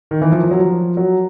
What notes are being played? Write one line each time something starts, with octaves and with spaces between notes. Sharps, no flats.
D#3
E3
F3
F3
F#3
F3
F#3